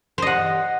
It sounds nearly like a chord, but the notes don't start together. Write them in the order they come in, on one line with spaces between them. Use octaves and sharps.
C5 D#5 F#5